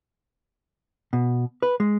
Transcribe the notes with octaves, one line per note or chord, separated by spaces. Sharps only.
B2
B4
G#3